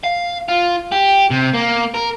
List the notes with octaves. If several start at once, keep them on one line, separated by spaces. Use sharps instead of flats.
F5
F4
G4
C3
A#3
A#4